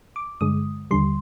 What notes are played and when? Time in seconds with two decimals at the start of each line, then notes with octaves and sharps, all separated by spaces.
0.16 D6
0.41 G2 D3 G#3 D#6
0.91 D#2 D3 G3 C6